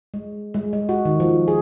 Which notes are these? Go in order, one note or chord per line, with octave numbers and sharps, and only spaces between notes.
G#3
G#3
G#3
F#4
D#3
F3
G#4